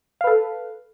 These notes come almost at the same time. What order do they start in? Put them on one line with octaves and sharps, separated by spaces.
F5 B4 A4